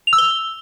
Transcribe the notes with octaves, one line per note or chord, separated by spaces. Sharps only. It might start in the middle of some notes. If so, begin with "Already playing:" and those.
F7
E6
G7